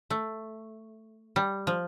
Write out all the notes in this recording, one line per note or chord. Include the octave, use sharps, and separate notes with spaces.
A3
G3
F3